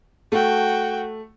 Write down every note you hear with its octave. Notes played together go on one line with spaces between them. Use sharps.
A3 F#4 G5